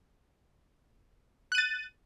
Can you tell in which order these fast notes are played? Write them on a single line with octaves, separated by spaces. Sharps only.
F#6 D#7 A6